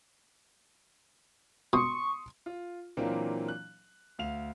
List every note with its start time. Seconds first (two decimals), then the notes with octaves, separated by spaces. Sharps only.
1.73 B2 C6 C#6 D#6
2.46 F4
2.97 A#2 E3 F#3 A#3 C4 D4
3.48 F#6
4.19 D2 F5 F7